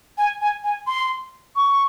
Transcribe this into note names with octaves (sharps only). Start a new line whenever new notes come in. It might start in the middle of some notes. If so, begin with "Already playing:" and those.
G#5
G#5
G#5
C6
C#6